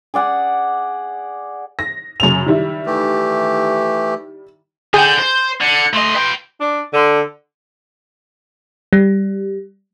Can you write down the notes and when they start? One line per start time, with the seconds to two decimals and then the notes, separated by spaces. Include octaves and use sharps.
0.14 G#4 D5 F#5 G#5
1.79 A#6
2.20 F#2 C#3 F7
2.46 D#3 G3 E4
2.86 E3 A3 G4
4.94 D3 G#4 G5 G6
5.19 C5
5.61 D3 C#7
5.93 A3 D#5 C6
6.14 B4 G5
6.61 D4
6.93 D3
8.93 G3